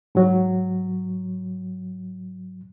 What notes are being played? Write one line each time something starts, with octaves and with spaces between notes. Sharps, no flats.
G#2 F#3